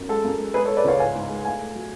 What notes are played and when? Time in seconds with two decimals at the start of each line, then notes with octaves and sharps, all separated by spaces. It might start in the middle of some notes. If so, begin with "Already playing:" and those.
Already playing: F#2
0.09 G#3 A4
0.24 F#2
0.39 G#3
0.54 G#3 G#4 B4
0.65 A4 C#5
0.69 G#3
0.77 B4 D5
0.84 C#2 C#5 F5
0.99 G#2 F5 G#5
1.15 G#2
1.30 G#3
1.45 A3 F5 G#5
1.60 A3
1.75 F#3